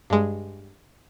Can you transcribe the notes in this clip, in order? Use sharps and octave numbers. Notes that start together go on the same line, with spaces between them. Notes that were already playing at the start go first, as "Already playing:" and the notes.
G2 G#3